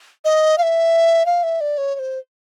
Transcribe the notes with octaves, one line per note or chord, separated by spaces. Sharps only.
D#5
F5
E5
F5
E5
D5
C#5
C#5
C5